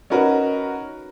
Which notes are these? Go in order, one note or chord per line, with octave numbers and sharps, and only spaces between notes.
C#4 D#4 F#4 A#4 B4